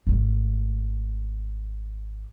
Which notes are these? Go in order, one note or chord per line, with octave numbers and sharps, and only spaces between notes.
G#1 A3